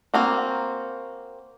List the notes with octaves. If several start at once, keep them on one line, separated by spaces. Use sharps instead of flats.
A#3 C4 F#4